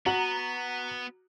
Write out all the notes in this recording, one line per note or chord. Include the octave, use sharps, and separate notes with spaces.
B3 F#4 A#5 F#7